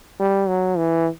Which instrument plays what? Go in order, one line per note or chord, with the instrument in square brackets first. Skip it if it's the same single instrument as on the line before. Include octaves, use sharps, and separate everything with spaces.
[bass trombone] G3
F#3
E3